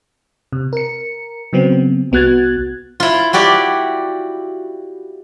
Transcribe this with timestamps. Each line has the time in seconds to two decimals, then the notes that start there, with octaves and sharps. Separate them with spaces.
0.52 C3
0.73 A#4 C#7
1.53 C#3 F#3 B3 C4
2.12 C2 B3 F#4 F#6 G#6 A6
3.00 E4 F4
3.33 E4 F#4 G4 D5